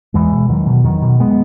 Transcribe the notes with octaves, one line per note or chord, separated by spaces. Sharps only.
E2 E3 G#3
B2
E2 D#3 F#3
B2
E2 D#3 F#3
B2
G#3 B3